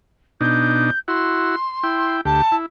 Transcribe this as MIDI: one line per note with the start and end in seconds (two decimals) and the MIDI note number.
0.41 0.91 47
0.41 0.91 62
0.41 0.91 63
0.41 0.99 91
1.08 1.56 64
1.08 1.56 66
1.08 2.16 84
1.83 2.21 64
1.83 2.21 79
2.25 2.42 38
2.25 2.42 67
2.25 2.55 81
2.52 2.66 64